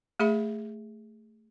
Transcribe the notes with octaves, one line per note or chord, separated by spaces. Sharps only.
A3 G#4 E5 B5